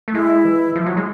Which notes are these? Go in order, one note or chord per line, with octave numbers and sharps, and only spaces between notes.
A3
G#3 E4
E3
F3
F#3
G#3